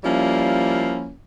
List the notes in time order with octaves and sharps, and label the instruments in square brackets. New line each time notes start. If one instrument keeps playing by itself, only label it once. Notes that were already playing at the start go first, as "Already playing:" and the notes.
[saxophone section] F3 G3 A#3 C#4 E4